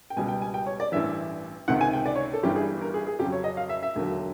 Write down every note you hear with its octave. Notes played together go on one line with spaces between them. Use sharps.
G5
C#2 B2 G3 G#5
G5
G#5
G5
C#5
D5
A1 G2 E3 E5
C#2 C3 D#3 F#5
G#5
G5
D5
C#5
A4
G1 G2 E3 G3 G4
G#4
A#4
G#4
G#4
F2 C#3 F#3 G4
C#5
D#5
F5
E5
E5
E1 D#2 D3 F#3